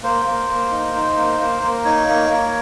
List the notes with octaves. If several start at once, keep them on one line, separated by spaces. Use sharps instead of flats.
A#3 C5
A#3
A#3
D#4
D#4
A#3
A#3
A#3
D#4 C#5
A#3
A#3